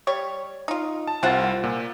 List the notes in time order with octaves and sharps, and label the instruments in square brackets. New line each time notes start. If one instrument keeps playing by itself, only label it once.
[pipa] G3 C#5
D#4 F4
[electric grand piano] A5
[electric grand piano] C2 F4 A6 [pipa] C4 C5 F#5
[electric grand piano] A#2